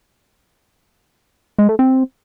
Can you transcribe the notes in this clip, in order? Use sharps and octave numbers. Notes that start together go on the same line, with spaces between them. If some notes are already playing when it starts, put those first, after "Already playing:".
G#3
A3
C4